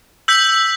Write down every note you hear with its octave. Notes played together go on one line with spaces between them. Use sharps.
E6 G6 B6 F#7